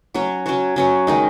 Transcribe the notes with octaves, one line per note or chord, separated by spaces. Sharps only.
F#3 C#4 F#4 C#5
F#3 C#4 F#4 C#5
F#3 C#4 F#4 C#5
D#3 G#3 D#4